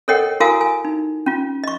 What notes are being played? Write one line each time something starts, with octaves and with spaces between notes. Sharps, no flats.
A4 A#4 C#5 D#5 F#5 G5
E4 F#4 A#4 F5 G#5 D#6
G#5
D#4
C#4 F4
D#5 C#6